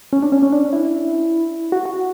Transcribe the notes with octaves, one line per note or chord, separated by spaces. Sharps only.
C#4
D4
C#4
C#4
D4
E4
F#4
F#4